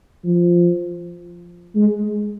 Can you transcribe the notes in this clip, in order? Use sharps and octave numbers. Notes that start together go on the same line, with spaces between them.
F3
G#3